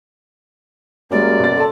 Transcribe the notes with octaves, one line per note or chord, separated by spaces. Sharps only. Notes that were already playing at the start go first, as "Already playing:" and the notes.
F#2 G3 G#3 A#3 D5
B2 A6
A4 A5 C6